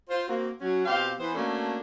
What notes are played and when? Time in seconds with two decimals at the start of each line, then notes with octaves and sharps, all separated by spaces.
0.09 F4 C5
0.27 A#3 C4 F#4
0.61 F#3 C#4 F#4
0.85 B2 C4 F4 G4 F5
1.20 E3 B3 C5
1.35 A3 A#3 C#4 D4 F#4 A4